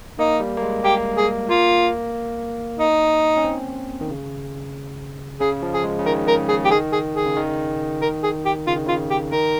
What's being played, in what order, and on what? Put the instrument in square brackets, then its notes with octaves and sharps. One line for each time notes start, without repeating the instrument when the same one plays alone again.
[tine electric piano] A#3 [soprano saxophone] D#4
[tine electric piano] G3
A#3
G#3
[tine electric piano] A#3 [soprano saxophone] G4
[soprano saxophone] G#4
[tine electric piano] A#3 [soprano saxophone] F4
[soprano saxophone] D#4
[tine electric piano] C#4
C4
D#3
C#3
[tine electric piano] C#3 [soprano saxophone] G#4
[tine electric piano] F3
[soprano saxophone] G#4
[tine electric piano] G#3
C#3
[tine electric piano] D#3 [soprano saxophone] A#4
[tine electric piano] C#3 [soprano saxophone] A#4
[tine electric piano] C#3 [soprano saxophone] G#4
[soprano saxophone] G4
[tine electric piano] D#3 [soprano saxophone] G#4
[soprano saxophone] G#4
G#4
[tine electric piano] C#3
D#3
[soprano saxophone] A#4
G#4
G4
[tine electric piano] C#3 [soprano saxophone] F4
[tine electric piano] D#3
[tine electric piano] C#3 [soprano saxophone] F4
[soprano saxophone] G4
[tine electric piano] D#3 [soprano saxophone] A#4